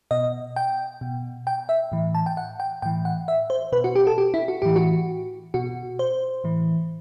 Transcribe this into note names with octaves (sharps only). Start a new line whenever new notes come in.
B2 D#5
G5
B2
G5
E5
A2 E3
A5
G5
F#5
G5
A2 E3 G5
F#5
E5
C5
B2 B4
F#4
G4
A4
G4
E4
F#4
A2 E3 G4
F#4
B2 F#4
C5
A2 E3